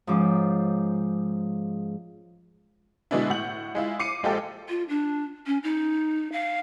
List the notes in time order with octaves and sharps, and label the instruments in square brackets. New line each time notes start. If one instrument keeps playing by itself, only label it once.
[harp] G#2 F3 C#4 D6
[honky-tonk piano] B2 D3 G#3 B3 D4 E4
A2 F#5 G6 F#7
G#3 E4 F4
D6 C7 C#7 D#7
A#1 G#3 F4 G4 A4
[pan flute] F4
D4
C#4
D#4
F5